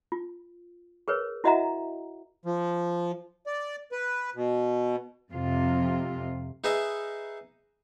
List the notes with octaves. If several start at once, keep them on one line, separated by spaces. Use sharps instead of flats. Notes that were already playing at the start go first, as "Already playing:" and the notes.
F4
G#4 A#4 B4 C#5
E4 F#4 D#5 E5 F#5 A#5
F3
D5
B4
B2
F2 C3 F4
D#4 G#4 B4 D#5 E5